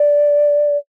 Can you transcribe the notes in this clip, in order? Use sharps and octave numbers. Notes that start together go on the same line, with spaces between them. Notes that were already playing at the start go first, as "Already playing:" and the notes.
Already playing: D5